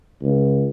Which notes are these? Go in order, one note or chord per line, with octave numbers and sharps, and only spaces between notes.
C#2